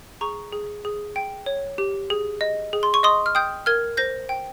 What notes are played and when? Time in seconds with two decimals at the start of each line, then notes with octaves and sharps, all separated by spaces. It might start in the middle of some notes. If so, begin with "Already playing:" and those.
0.21 G#4 A#5 C#6
0.53 G#4
0.85 G#4
1.16 G5
1.46 C#5
1.78 G4
2.10 G#4
2.41 D#5
2.73 G#4
2.83 C6
2.94 C#6
3.03 D#5 C6 D#6
3.26 F6
3.35 G5 D#6 G6
3.66 A#4 F6 G#6
3.97 C5 G6 A#6
4.29 G5